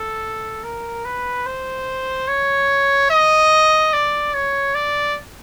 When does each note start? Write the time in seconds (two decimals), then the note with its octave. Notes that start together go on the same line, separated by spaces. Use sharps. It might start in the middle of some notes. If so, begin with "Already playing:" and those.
Already playing: A4
0.63 A#4
1.05 B4
1.46 C5
2.28 C#5
3.10 D#5
3.93 D5
4.34 C#5
4.75 D5